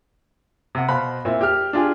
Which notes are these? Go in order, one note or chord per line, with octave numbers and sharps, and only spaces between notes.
C3 F#5
B2 C5 F5 B5 F#6
A#2 C4 E4
G4 F6
D4 F4 G4 G#4